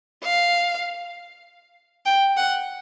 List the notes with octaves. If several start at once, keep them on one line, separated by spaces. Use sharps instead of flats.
F5
G5
F#5